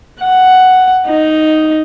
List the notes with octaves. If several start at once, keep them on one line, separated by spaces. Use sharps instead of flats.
F#5
D#4